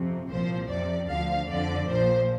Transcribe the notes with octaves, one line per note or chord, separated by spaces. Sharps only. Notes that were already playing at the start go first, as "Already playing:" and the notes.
Already playing: F2 C3
C2 A#2 F3 C5
F2 C3 F3 D5
D2 D3 F3 F5
F2 D3 F3 D5
A#1 A#2 F3 C5